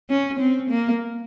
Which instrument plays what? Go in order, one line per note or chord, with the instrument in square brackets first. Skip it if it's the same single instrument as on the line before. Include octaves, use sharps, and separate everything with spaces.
[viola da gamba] C#4
C4
A#3